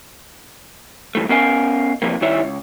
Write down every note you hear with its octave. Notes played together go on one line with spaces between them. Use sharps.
G2 E3 A3
B3 C#4 A#4 D#5 F5 G#5
C3 E3 F3 A#3
G2 D#3 G3 E4 C#5 E5
C#2